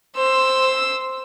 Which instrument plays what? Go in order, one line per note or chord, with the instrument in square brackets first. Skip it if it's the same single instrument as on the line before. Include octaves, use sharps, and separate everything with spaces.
[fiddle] C5 E6